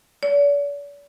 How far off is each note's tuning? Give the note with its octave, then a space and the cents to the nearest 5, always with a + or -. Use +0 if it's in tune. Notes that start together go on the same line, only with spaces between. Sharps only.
D5 -45